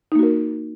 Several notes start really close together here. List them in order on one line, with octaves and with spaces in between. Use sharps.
D#4 A#3 F#4 A#4